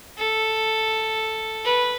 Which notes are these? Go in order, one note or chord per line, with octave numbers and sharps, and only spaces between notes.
A4
B4